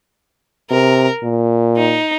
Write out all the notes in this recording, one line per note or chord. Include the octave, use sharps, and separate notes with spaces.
C3 A#4
A#2
D#4